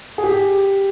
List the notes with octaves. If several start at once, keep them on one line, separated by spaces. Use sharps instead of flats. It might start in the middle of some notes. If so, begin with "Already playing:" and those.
G#4
G4